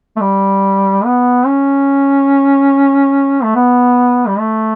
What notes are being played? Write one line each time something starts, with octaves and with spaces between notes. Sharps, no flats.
A3
G3
B3
C#4
A3
B3
G3
A3